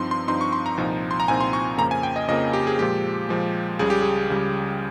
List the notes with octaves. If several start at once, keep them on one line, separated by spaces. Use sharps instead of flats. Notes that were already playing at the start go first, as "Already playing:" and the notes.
Already playing: G2 F3 C4 D#4 C6
C6
G2 F3 C4 D#4 C6
C#6
C6
A#5
C2 A#2 F3 C4 D#4
C6
A#5
C2 A#2 F3 C4 D#4 G#5
C6
C#6
F2 C#3 F3 A#3 A#5
G#5
G5
D#5
F2 C#3 F3 A#3 D#5
G4
G#4
A#2 F3 G#3 G4
A#2 F3 G#3
C#2 C#3 G3 G#4
G4
G#4
C#2 C#3 G3